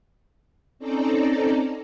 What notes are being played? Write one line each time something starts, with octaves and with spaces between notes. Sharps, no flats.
C4 C#4 D#4 A4 D5 A#5